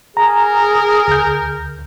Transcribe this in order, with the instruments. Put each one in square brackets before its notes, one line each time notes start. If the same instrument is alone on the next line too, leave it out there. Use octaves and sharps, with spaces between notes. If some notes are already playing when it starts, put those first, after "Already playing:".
[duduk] G#4 [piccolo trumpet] A#4 [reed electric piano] A#5
[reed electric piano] D2 G6